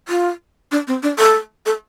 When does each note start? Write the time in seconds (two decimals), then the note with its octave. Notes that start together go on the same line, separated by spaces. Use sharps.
0.08 F4
0.72 D4
0.87 C4
1.03 D4
1.19 A4
1.66 A4